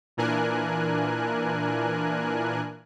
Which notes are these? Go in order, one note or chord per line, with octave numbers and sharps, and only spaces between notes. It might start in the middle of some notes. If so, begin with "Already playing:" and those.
A#2 E3 D4 A#4 G#5 F#6